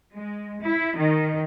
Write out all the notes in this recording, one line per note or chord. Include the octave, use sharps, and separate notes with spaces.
G#3
E4
D#3